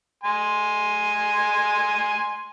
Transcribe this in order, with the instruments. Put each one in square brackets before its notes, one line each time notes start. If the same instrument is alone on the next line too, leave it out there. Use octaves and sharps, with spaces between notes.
[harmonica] G#5 C6